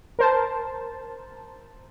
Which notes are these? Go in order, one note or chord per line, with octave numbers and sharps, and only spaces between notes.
A#4 C5 A5